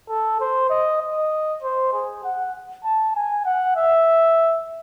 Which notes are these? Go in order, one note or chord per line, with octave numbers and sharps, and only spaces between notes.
A4
C5
D#5
D#5
C5
G#4
F#5
A5
G#5
F#5
E5